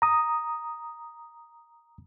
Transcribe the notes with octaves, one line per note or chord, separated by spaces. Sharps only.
A#5 D#6